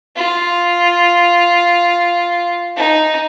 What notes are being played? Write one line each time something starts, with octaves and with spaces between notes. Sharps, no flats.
F4
D#4